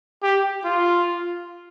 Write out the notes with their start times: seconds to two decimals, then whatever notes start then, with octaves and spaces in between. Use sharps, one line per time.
0.23 G4
0.65 F4